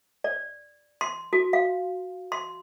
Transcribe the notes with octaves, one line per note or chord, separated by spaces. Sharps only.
D5
C6
F#4
F5
C6